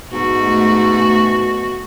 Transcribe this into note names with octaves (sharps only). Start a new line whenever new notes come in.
G#2 B2 A3 F#4